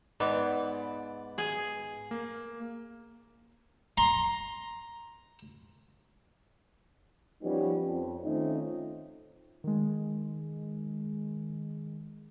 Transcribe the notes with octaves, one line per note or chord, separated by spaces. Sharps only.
G#2 B3 D5
G#4 G#5
A#3
A#5 C6
F3 G3 B3 C#4 D#4 G4
F2
D#3 A3 C4 C#4 D#4 F4
D#3 G#3